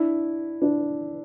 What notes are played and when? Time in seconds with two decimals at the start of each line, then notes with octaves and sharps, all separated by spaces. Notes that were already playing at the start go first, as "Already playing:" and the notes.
Already playing: D4 E4
0.62 D4 E4